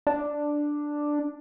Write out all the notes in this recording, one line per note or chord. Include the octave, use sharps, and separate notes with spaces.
D4